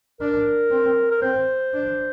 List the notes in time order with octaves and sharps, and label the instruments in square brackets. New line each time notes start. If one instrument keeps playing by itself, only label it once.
[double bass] D4 [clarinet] A#4
[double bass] C4
[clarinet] A#4
[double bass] C4 [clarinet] C5
[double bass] D4